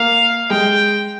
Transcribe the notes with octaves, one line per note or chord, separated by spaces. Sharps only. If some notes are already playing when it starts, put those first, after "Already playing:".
Already playing: A#3 F5
G#3 G5